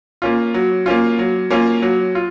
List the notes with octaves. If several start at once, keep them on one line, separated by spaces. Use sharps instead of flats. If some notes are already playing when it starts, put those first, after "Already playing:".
A#3 C#4 F4
F#3
A#3 C#4 F4
F#3
A#3 C#4 F4
F#3
F4